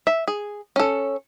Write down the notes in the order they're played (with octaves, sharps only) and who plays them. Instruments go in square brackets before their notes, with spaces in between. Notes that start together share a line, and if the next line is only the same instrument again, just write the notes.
[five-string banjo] E5
G#4
C#4 A4